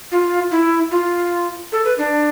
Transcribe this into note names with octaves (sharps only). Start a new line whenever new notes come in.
F4
E4
F4
A4
B4
D4